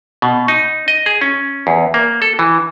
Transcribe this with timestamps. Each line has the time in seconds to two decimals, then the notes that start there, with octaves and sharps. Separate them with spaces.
0.22 B2
0.48 D#4
0.88 D#5
1.06 G#4
1.21 C#4
1.67 E2
1.94 A#3
2.22 A4
2.39 E3